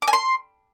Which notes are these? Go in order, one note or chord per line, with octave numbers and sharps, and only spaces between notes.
D6
G#5
C6